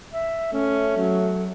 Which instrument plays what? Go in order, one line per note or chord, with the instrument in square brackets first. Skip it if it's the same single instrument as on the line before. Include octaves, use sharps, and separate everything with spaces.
[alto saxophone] E5
[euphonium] A3 [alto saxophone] C#4
[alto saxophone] F#3